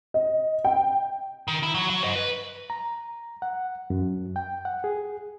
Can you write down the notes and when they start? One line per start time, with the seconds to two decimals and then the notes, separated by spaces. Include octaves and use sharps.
0.14 D#5
0.65 G5
1.48 D#3
1.63 E4
1.74 F#3
1.90 F#3
2.03 C5 D#5
2.16 B4
2.70 A#5
3.42 F#5
3.90 F#2
4.36 G5
4.65 F#5
4.84 G#4